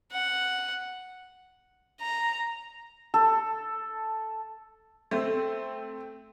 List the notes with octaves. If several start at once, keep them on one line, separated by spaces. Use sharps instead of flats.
F#5
A#5
A4
A3 C4